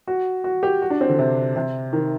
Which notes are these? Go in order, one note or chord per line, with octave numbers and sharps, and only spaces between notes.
F#4
F#4
G4
F#4
D4
C4
D3
C3
C3
D#3